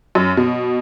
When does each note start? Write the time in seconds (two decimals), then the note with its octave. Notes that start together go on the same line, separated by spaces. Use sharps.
0.15 F#2
0.37 B2